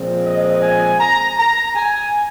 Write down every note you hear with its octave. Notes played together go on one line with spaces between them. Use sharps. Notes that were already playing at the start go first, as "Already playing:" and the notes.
Already playing: A#2 F3 G#3 C4
D#5
G#5
A#5
A#5
G#5